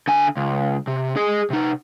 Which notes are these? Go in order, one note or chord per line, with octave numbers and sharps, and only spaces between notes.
D3 G#5
C#2
C3
G#4 D#5
C3 D#4